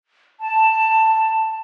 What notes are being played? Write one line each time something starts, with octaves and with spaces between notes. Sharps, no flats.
A5